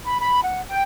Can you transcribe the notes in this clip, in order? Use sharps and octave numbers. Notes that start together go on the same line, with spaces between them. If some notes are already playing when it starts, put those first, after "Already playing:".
B5
B5
F#5
G5